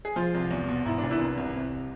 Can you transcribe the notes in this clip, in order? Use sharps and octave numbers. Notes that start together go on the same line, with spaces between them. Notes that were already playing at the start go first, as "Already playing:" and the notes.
G#4
F3 F4
C2
E2
B2
G#2 E4
D4
G#1
E3 E4
C2
C2
C3